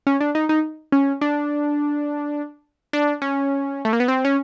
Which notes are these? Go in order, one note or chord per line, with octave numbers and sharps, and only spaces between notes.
C#4
D4
D#4
D#4
C#4
D4
D4
C#4
A3
A#3
B3
C4
C#4